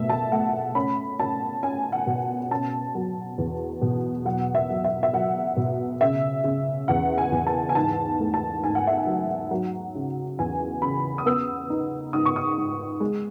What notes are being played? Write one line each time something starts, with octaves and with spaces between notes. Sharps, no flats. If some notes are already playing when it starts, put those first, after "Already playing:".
Already playing: B2 A3 E5
A5
A3 F#5
C#4 B5
C#4 A5
C#4 G#5
F#5
B2
C#4 A5
F#3
E2
B2
F#3 F#5
E5
F#3
E5
E5
F#3 F#5
B2
C#3 E5
C#3
E2 F#5
G#5
E2
A5
G#5
G#2 A5
A3
A5
G#2 G#5
F#5
E5
F#5
F#3
F#3
C#3
E2 G#5
C#3 B5
D#6
B3 E6
D#4
G#2 D#6
C#6
D#6
G#2
G#3